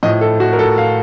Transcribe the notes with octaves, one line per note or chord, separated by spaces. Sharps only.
A2 F3 D#5
A4
F#4
A#4
A4
F5